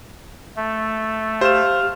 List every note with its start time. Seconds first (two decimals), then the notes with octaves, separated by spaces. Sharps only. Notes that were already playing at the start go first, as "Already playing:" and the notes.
0.56 A3
1.41 G4 C5 F5 E7